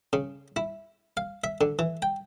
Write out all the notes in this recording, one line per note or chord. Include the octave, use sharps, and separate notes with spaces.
C#3
E4
F5
E5
D3
E3
G5